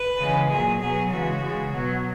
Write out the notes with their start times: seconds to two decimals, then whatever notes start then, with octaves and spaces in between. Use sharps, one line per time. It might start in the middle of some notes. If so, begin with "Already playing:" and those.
Already playing: B4
0.18 C#3 E3 G#3
0.50 A#2 F#3 G#4
0.80 B2 F#3 G#4
1.11 C#3 E3 G#3 F#4
1.42 C#3 G#3
1.72 B2 F#3